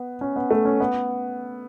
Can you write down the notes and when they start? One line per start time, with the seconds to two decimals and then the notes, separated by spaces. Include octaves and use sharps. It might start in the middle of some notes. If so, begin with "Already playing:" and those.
Already playing: B3
0.21 C#4
0.36 B3
0.50 A3
0.65 C#4
0.80 B3